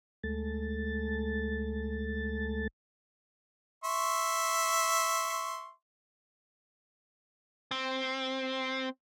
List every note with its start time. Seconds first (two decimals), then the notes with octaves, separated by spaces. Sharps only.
0.24 D2 G#3 A3 A4 A6
3.84 E5 C6 C#6
7.71 C4